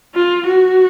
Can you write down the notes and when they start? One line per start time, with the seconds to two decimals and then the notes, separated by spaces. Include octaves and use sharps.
0.15 F4
0.47 F#4